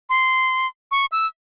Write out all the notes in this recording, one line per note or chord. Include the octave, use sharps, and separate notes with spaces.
C6
C#6
E6